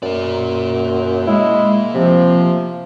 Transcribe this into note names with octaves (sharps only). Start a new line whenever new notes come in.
F#2 A#3 D5
G#3 E4
C3 F3